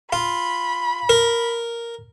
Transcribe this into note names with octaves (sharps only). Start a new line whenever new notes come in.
F4 B5
A#4